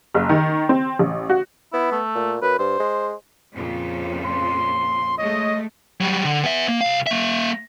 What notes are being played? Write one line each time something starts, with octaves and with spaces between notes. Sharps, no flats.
F#1
D#3
C4
A1
F#4
B3 E4
A3
A#2
F#2 B4
G2 C5
G#3
F2 A#2 C#3
C6
G#3 A3 C#5 D#5
F#3 G3
D3
B3 E5
A#3
C2 F5
A#3 E5